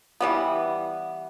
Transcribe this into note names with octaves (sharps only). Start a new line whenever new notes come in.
E3 G3 B3